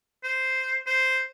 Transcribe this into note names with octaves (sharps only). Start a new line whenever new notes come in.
C5
C5